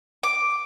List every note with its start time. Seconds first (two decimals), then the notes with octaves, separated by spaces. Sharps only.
0.23 D6